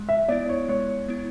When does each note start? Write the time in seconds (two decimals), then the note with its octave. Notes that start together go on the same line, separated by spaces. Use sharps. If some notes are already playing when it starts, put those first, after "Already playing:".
Already playing: G#3
0.09 E5
0.28 B3 E4 D5
0.49 C#5
0.69 G#3 C#5
1.09 B3 E4